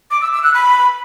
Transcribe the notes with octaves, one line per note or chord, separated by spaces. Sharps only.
D6
E6
E6
F#6
B5